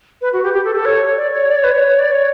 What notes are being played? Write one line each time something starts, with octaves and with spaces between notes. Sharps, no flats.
B4
F#4
G4
G4
A4
A4
C#5
D5
C#5
D5
C#5
B4
C#5
D5
C#5